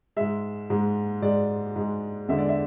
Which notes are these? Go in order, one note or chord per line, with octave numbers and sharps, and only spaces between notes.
G#2 G#3 E5
G#2 G#3
G#2 G#3 D5
G#2 G#3
E2 D3 G#3 E5
D5
E5